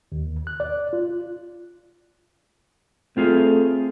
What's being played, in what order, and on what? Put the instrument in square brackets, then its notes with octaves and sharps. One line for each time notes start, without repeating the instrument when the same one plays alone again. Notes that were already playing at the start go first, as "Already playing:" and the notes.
[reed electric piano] D#2
F#6
D5
F4
[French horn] A3 [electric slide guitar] C4 F4 G#4